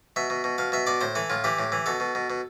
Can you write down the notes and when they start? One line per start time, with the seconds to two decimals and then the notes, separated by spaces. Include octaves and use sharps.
0.16 B2 E5
0.30 B2
0.44 B2
0.58 B2 F5
0.72 B2 E5
0.87 B2 D5
1.01 A2 C5
1.15 E3 A4
1.30 A2 F4
1.44 E3 G4
1.59 A2
1.72 E3
1.86 B2 A4
2.00 B2
2.15 B2
2.30 B2